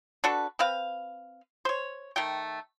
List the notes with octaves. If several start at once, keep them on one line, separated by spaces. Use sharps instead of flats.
D4 F#4 A4 B4
C4 B4 F5
C5 C#5
D#3 A3 G5